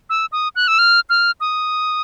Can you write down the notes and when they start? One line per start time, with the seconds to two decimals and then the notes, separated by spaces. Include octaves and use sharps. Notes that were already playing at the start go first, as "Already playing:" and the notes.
0.10 E6
0.32 D#6
0.56 F#6
0.68 E6
0.79 F6
1.10 F6
1.41 D#6